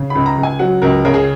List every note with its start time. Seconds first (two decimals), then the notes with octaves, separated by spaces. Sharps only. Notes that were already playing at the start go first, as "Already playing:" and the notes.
Already playing: C#3
0.10 C#2 B5
0.26 A#5
0.38 C#2
0.43 G#5
0.59 F#3 F#5
0.82 C#2 A#4
1.05 C#3 A#4
1.14 G#4